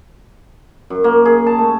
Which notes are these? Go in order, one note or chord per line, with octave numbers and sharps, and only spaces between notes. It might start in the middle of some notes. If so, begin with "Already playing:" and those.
F#2
A#3
G#4
A5
A3